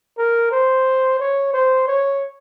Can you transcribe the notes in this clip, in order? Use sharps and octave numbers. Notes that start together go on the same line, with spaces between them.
A#4
C5
C#5
C5
C#5